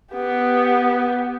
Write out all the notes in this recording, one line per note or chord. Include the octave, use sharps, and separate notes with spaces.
B3 G4